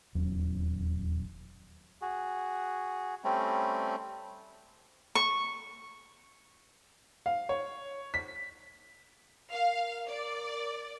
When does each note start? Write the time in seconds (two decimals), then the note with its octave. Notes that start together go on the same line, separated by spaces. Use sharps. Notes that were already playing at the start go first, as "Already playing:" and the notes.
0.15 D#1 E2 F#3 C#4
2.01 F#4 G#4
3.24 G3 A3 C4 C#4
5.15 C#6
7.26 F5
7.49 C#5
8.14 B6
9.52 A#4 F5
10.09 D5